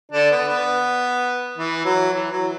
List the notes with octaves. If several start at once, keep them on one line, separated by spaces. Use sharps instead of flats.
D3 D4
B3
B3
E3
F#3
E3
F#3